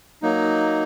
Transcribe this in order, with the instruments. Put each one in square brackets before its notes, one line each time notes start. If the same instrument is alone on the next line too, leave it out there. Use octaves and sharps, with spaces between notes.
[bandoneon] F#3 A#3 D#4